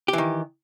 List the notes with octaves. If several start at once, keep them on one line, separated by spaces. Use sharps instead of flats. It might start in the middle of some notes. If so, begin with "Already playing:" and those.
D#3 E3 G4